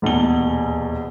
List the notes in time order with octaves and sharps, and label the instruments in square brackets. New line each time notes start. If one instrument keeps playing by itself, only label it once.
[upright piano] D#1 E2 B2 G7